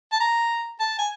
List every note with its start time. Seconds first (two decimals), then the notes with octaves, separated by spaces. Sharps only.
0.12 A5
0.21 A#5
0.80 A5
0.99 G#5